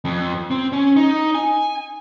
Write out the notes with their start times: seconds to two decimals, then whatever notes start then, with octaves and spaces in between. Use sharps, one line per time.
0.05 F2
0.51 C4
0.73 C#4
0.96 D#4
1.35 G#5